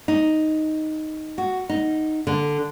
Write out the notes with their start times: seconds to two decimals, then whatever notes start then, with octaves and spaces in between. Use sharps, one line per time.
0.08 D#4
1.38 F#4
1.69 D#4
2.27 D3